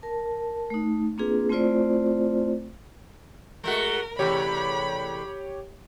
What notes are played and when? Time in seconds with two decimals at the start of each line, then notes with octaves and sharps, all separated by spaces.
0.02 A#4 A5
0.70 A3 D#4
1.18 A#3 C4 D4 F4 G#4 B4
1.49 A3 C4 E4 F4 C5 D5
3.64 G#3 A3 F#4 A#4
4.19 E2 C3 A3 G4 C#5 B5